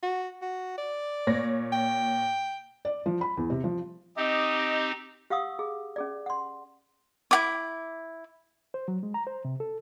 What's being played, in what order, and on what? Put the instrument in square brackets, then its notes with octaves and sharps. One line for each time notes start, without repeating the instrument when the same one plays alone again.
[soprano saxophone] F#4
F#4
D5
[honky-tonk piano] A#2 C#5 A#6
[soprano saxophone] G5
[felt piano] D5
F3
B5
E2
C3
F3
[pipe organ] C4 D#4 G4 [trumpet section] D#5
[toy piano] G4 F5 F#5 C#6 D#6 E6
G#4
C#4 G#4 D5
F#5 C6
[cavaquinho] E4 F#4 D6
[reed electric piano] C5
F#3
G#3
A#5
C5
C3
A4